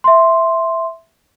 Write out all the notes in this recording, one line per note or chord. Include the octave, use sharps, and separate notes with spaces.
E5 C6